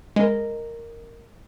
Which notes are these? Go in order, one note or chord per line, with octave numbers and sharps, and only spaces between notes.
G#3 A#4 D#5